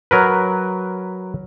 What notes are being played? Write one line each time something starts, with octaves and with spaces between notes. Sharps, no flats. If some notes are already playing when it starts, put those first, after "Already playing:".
F#3 A#4 B4